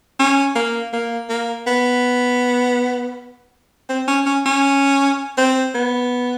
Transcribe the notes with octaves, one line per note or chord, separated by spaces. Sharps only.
C#4
A#3
A#3
A#3
B3
C4
C#4
C#4
C#4
C4
B3